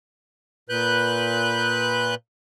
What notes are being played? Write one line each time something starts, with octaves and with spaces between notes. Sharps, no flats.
A#2 B4 F#6 G6